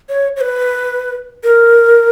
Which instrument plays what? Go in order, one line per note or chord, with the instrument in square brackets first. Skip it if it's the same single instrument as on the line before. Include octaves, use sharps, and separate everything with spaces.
[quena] C#5
C#5
B4
A#4